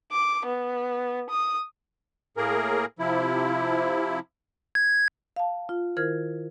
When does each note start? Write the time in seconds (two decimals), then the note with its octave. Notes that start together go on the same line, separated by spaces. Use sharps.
0.12 D6
0.46 B3
1.30 D#6
2.37 A2 A#3 G#4 A#4
2.99 C3 F3 E4
4.75 G#6
5.36 F5 A5
5.69 F4
5.97 D#3 E4 A#4 C5 F6 G#6